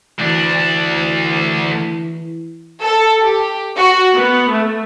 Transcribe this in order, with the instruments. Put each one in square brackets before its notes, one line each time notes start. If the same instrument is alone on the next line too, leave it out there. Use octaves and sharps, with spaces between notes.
[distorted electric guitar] D2 D4 [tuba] E3
[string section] A4
G4
F#4
B3
A3